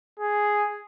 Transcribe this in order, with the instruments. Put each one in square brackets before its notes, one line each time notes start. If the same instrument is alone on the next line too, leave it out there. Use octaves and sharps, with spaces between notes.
[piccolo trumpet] G#4